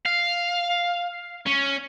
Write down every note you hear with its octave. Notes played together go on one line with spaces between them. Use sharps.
F5
C#4